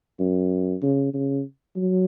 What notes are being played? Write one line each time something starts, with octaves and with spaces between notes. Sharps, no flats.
F#2
C#3
C#3
F#3